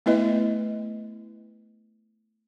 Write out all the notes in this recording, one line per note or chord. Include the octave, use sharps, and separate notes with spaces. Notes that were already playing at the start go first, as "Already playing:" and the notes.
A3 B3 E4 B4 D#5